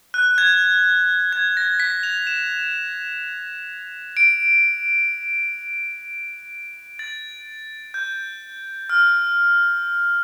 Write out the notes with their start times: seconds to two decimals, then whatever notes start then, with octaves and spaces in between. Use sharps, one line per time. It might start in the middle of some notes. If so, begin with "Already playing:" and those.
0.14 F#6
0.38 G#6
1.32 G#6
1.57 A#6
1.80 B6
2.03 F7
2.27 E7
4.17 D7
6.99 A6
7.94 G6
8.90 F6